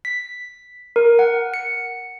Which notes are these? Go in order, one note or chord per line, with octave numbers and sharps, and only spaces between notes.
B6
A#4
F#5
C#7